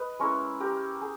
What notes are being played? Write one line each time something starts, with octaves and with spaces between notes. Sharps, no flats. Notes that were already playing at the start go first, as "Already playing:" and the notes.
Already playing: B4 D#5
G#3 C#4 E4 A#4 C#5
G4 A#4
G#4